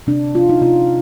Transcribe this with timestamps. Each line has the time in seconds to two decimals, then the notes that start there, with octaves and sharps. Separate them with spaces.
0.07 C3 D4
0.35 C3 F4
0.49 D#4
0.61 C3 F4